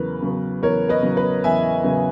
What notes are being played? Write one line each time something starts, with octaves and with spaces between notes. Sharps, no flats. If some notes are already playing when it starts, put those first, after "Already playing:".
Already playing: E2 C#3 F#3 A#4 B4
C#3 F#3 B3
E2 A#4 C#5
B4 D#5
C#3 F#3 B3
B4
E2 E5 G#5
C#3 F#3 B3